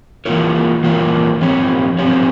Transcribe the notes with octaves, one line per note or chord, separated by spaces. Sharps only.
E3 A#3 F4 A#4 C#5
E3 A#3 F4 A#4 C#5
F3 C4 G4 C#5
F3 C4 G4 C#5